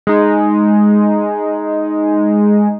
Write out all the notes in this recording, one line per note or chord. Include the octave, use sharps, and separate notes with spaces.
G#3 D#4